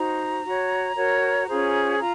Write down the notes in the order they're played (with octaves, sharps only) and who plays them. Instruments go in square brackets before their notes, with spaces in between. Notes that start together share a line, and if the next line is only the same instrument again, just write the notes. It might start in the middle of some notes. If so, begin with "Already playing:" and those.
Already playing: [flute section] D#4 F#4 C5 A#5
F#4 C#5
F#4 A#4 C#5
C#4 F4 G#4 C5
F4 A#5